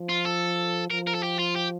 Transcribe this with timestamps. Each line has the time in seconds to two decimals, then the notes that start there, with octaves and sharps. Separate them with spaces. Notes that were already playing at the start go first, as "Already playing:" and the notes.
Already playing: F3
0.09 F4
0.25 A4
0.90 F3 A#4
1.07 A#4
1.14 A4
1.23 G4
1.39 F4
1.56 G4